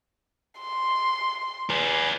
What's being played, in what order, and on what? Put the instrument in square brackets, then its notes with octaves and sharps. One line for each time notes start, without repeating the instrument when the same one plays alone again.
[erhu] C6
[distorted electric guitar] G#4 B4